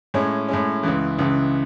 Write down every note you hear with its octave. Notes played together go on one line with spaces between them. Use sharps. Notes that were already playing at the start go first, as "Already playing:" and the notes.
A2 G#3 C#4
A2 G#3 C#4
C#2 C#3 E3
C#2 C#3 E3